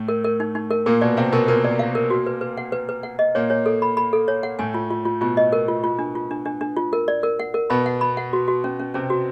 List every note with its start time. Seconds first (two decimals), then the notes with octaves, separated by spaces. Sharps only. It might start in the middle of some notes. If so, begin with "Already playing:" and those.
Already playing: A2 A3
0.08 A#4
0.24 A#4
0.40 D#4
0.55 D#4
0.71 A#4
0.86 A#2 A#3 A#4
1.01 B2 B3 D5
1.17 C3 C4 F5
1.32 B2 B3 A#4
1.48 A#2 A#3 A#4
1.64 D5
1.79 F5
1.95 A#4
2.10 F#4
2.26 B4
2.41 B4
2.57 F#5
2.72 B4
2.89 B4
3.03 F#5
3.19 D#5
3.35 A#2 A#3 C#5
3.50 C#5
3.66 A4
3.82 B5
3.97 B5
4.13 A4
4.28 C#5
4.43 F#5
4.59 A2 A3 G#5
4.74 F4
4.91 F4
5.05 F4
5.21 B2 B3 F4
5.37 D#5
5.53 A#4
5.68 F4
5.84 F4
5.99 D4
6.15 F4
6.31 D4
6.45 D4
6.61 D4
6.76 F4
6.93 A#4
7.08 D5
7.23 A#4
7.39 F#5
7.54 A#4
7.70 B2 B3 B5
7.86 F#5
8.01 B5
8.17 F#5
8.33 F#4
8.48 F#4
8.64 C#4
8.80 C#4
8.94 C3 C4 C#4
9.10 F#4